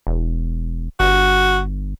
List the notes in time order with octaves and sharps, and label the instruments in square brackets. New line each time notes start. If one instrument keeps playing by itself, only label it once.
[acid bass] E1
[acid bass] G1 [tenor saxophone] F#4